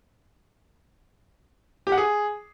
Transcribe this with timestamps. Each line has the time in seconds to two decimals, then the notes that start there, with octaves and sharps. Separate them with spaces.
1.87 G4
1.92 F#5
1.98 G#4